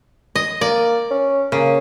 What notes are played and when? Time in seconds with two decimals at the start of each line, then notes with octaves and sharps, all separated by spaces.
0.36 D#5
0.61 A#3 D5
1.11 C#4
1.52 C#3 A#3